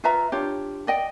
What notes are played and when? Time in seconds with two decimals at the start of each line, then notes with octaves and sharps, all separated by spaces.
0.04 F4 B4 E5 A#5
0.32 D4 F4 G4 C#5
0.87 D5 D#5 G5